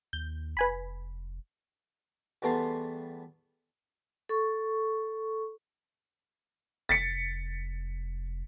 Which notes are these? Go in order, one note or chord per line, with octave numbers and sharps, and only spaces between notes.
D#2 G6
F1 B4 G#5 B5
E2 G3 A3 B3 A#5 C6
A4 C#6
F1 A6 B6 C#7